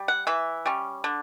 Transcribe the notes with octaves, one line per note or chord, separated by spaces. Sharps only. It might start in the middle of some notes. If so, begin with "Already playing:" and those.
Already playing: G3
F#5
E3 E5
G3 C#4
D3